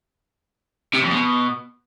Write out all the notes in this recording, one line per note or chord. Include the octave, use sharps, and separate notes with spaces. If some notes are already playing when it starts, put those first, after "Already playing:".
C3
F2
B2